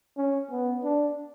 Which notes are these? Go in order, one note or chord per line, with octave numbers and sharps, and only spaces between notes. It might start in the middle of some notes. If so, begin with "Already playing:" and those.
C#4
B3
D4